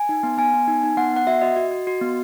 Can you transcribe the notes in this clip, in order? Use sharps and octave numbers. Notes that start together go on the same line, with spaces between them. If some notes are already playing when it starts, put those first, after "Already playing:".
Already playing: G#5
D#4
B3
B3 G#5
B3
D#4
D#4
B3 F#5
B3 F#5
F#4 E5
F#4 D#5
F#4
F#4
F#4
B3